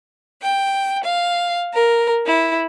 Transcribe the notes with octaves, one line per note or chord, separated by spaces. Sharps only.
G5
F5
A#4
E4